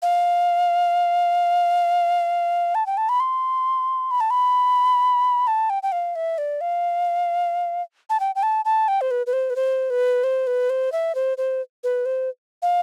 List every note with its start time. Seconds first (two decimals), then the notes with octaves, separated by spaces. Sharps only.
0.02 F5
2.75 A5
2.86 G5
2.97 A5
3.09 B5
3.20 C6
4.11 B5
4.20 A5
4.30 B5
5.47 A5
5.70 G5
5.83 G5
5.92 F5
6.15 E5
6.38 D5
6.61 F5
8.10 A5
8.20 G5
8.35 G5
8.43 A5
8.65 A5
8.88 G5
9.01 C5
9.11 B4
9.27 B4
9.33 C5
9.50 B4
9.56 C5
9.90 B4
10.24 C5
10.47 B4
10.70 C5
10.92 E5
11.15 C5
11.38 C5
11.84 B4
12.06 C5
12.62 F5